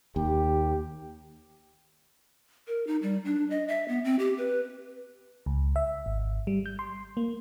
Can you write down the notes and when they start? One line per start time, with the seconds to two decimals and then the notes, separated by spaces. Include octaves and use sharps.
0.16 D#2 G4
2.67 A#4
2.87 D#4
3.03 G3
3.25 D4
3.50 D#5
3.68 E5
3.88 B3
4.04 C4
4.19 G4
4.38 B4
5.46 C#2
5.76 E5
6.06 G#1
6.47 G3
6.66 G6
6.79 C6
7.17 A#3